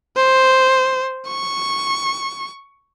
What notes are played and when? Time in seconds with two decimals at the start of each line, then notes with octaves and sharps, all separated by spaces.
0.17 C5
1.28 C#6